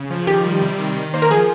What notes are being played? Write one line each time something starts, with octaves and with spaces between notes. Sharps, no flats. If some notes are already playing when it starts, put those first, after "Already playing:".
Already playing: C#3
F3
D#3 G4
G3
C3
D#3
D#3
A#3 C5
A#4
F3 G#4